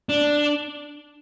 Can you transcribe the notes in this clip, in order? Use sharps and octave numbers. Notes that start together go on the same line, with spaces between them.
D4